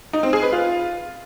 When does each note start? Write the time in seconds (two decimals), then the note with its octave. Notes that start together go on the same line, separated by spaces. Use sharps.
0.13 D#4
0.23 C4
0.33 G#4
0.43 B4
0.53 F4